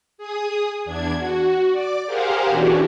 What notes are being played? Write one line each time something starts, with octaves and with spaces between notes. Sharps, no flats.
G#4 D#6
E2 D4 G#6
F#4
D5 D6
G4 G#4 A#4 C5 F5 F#5
B2 E3 C#4 D4 F#4 G4